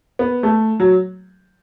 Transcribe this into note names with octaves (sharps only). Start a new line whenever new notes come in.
B3
A3
F#3